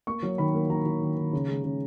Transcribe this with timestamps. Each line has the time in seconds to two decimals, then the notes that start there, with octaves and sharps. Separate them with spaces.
0.07 A#3 C#6
0.23 F#3
0.38 D#3 B5
0.54 A#3
0.70 F#3 A#5
0.86 F#3
1.01 D#3
1.17 D#3
1.33 C#3
1.49 G#3
1.64 C#3